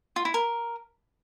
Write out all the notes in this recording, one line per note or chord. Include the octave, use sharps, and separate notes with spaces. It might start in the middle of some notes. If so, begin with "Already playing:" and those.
F4
E4
A#4